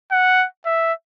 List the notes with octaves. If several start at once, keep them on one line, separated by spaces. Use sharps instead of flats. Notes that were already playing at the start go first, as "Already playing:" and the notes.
F#5
E5